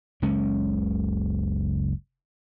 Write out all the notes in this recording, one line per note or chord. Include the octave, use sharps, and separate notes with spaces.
F#1 C#2 G#3 C#4